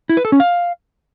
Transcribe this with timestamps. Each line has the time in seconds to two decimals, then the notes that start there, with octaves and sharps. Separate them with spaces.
0.09 E4
0.17 B4
0.25 A4
0.32 C#4
0.40 F5